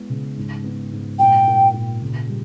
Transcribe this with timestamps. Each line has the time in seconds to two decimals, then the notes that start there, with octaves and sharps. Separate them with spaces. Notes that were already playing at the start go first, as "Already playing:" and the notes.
Already playing: G#3 B3 E4
0.10 C#3
0.37 G#2
0.64 B3
0.92 G#2
1.19 A#2 G5
1.47 A#2
1.74 A#2
2.02 C#3
2.29 G3